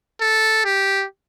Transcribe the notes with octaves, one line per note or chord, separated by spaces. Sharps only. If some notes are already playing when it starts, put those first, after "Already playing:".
A4
G4